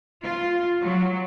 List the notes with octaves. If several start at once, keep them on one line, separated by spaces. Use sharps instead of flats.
F4
F#3